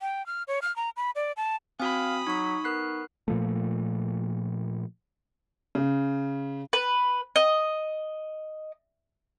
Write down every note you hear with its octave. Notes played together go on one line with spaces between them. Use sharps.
G5
F6
C#5
F6
A#5
B5
D5
A5
C4 F#4 F5 G#5 B5 D#6
F#3 D#4 C#6 B6
B3 A#4 F#6 C7
A#2 F3 A3
C#3
B4
D#5